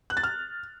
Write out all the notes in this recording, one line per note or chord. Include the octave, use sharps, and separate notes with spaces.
F#6
A6
F6